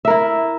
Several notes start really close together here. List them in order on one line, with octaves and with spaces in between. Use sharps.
E5 A#4 E4